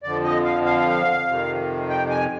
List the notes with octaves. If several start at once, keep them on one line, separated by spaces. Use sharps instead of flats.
F2 D3 F3 D5
D#5
F5
F5
F2 C3 D#3
G5
G#5